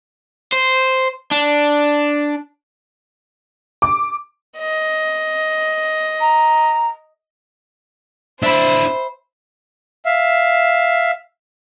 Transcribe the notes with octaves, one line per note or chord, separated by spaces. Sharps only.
C5
D4
D6
D#5
A#5
D4 E4 C5 E5 B5
E5 F5